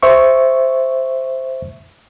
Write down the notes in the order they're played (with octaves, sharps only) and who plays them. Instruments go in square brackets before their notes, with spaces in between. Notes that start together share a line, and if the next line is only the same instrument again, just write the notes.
[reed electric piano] C5 E5 C#6